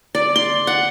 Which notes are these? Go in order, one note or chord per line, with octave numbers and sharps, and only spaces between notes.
D5
C6
F#5